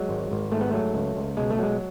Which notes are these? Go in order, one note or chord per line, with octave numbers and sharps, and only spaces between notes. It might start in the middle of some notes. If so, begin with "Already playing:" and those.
Already playing: F#3 G#3
G#1
G#1
G#2 A3
B3
F#3 A3
C#2
C#2
B2 G#3
A3
F#3 G#3